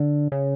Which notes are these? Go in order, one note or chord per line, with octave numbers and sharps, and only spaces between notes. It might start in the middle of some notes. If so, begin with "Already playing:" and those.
Already playing: D3
C#3